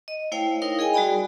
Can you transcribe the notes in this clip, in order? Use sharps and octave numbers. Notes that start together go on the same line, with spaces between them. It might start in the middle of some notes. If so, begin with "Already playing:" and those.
D#5
A3 E4 C5 C#5 F5 G5
D#4 E4 A#4 F5 D#6
G#4 D#5 G5 G#5
G3 F#4 G#4 D5 G5 B5